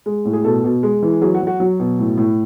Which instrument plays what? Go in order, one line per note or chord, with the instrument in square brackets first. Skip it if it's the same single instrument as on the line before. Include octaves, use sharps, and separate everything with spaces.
[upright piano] G#3
A2
G#4
B2 A4
B2
G#3
E3
F#3 G#4
F#4
F#3
F#4
F#3
B2
A2
A2